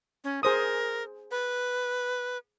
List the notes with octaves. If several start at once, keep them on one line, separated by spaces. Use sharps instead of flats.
C#4
G#4 A#4 C5 D#6
B4